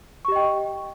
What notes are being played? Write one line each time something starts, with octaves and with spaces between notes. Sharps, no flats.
G4 D#5 G5 C#6